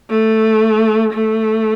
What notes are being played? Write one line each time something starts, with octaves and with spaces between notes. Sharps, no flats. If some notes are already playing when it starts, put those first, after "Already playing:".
A3
A3